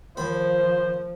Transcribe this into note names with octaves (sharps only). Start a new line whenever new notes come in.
D#2 F3 C5 B5